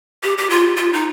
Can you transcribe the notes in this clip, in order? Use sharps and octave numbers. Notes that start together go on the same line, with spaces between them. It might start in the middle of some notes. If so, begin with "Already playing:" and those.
G4
G4
F4
F4
D#4